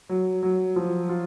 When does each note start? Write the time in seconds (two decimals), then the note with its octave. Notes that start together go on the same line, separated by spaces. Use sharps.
0.09 F#3
0.43 F#3
0.76 F3
1.09 F4